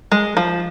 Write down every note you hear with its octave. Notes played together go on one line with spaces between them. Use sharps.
G#3
F3